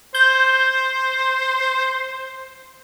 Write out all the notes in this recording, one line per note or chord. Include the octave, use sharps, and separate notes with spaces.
C5 G6